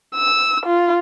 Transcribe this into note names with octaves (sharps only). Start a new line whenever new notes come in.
E6
F4